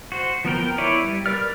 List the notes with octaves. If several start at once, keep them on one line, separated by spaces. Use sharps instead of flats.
F#4 C5
F3 B3 A#4 G5
E4 B4 C#5 D5
G3
A#4 B4 D5 F6